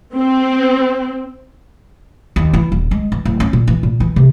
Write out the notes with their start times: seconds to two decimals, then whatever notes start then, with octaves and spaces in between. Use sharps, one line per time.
0.16 C4
2.36 D#2
2.54 E3
2.72 D#1
2.91 G#3
3.12 E3
3.25 D1
3.40 C#4
3.53 A#2
3.68 E3
3.83 A#2
4.00 E3
4.16 C3